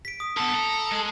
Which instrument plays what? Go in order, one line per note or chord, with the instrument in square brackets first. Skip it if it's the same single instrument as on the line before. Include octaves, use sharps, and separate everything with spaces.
[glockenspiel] B6 D7
D#6
[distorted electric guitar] D3 B3 [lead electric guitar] A4
[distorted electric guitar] A#5
G#3